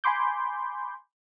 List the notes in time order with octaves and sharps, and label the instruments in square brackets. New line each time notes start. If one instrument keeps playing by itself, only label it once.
[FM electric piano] G#5 B5 C6 D6 G6